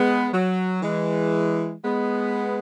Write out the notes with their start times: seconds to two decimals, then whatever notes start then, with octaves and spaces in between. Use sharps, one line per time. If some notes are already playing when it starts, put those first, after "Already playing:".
Already playing: G#3 B3
0.33 F#3
0.83 E3 G#3
1.84 G#3 B3